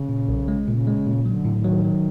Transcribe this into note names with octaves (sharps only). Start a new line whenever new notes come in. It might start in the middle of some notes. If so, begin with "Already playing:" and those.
Already playing: C#3
A#2
B1
G#3
A#2 C#3
G#3
A#2
D3 F#3
A2
D#3
F#3
F#3